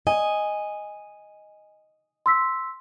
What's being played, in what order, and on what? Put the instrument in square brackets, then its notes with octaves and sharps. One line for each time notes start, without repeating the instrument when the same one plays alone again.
[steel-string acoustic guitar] D#5 [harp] G#5
[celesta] C6 E6 B6